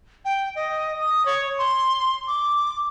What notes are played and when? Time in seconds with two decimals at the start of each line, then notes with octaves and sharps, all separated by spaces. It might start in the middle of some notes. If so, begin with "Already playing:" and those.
0.25 G5
0.55 D#5
1.00 D#6
1.26 C#5
1.59 C6
2.27 D6